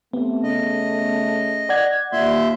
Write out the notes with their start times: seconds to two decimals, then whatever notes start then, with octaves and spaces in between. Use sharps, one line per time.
0.13 C3 A3 B3
0.43 C#3 D#5
1.69 D5 F#5 G#6
2.12 D#2 A#2 E5 C6